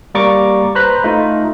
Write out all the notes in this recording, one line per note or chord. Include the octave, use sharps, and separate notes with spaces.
G3 A#3 D5 A#5 C#6 D6
B4 C5 A#5 B5 F#6
A3 D#4 F4